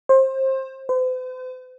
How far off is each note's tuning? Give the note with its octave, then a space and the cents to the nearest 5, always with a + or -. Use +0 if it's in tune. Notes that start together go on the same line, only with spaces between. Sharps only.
C5 +25
C5 -45